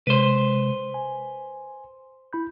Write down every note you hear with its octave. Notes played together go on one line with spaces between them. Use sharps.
C3 G#3 B4 C5
G#5
E4 B5 G6